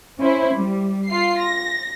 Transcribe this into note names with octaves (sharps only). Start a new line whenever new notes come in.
C#4 E4 C5
G3
F4 C7
A#6